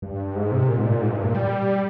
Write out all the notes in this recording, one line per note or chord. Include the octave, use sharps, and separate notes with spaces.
G2
G#2
C3
A#2
G#2
A#2
G#2
G2
A#2
G3